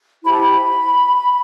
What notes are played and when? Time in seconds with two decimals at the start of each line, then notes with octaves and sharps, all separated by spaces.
0.24 E4 G4 C5 B5
0.31 A5
0.39 B5